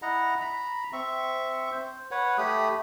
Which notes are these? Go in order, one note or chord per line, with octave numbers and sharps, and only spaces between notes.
E4 D#5 F#5 A#5
A#5 B5
C4 E5 C#6
C5
B4 C#5 F#5
A3 G4 B5 D#6